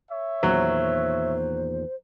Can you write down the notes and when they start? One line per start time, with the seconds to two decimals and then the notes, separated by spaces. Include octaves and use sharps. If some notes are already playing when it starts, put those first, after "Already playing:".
0.12 C#5 E5
0.43 E2 A#2 D#3 F#3 C5